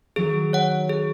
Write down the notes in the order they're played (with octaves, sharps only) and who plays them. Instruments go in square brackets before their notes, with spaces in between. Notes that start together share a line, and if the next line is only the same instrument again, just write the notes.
[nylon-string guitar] D#3 F#3 [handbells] G#4
[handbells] C#5 F#5
G#4